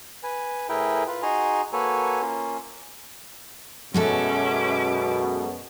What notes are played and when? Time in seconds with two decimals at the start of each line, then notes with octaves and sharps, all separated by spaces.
0.23 B4 G#5
0.69 A2 E4 G#4 A#4 B4 G5
1.07 F4 B4
1.23 D#4 F#4 G#4 G#5 A#5 C6
1.73 A#3 F#4 A4 B4 C#5 G#5
2.22 A#3 C#4 F4
3.94 F#2 B2 G#3 C#4 F#4 A4 E5 D6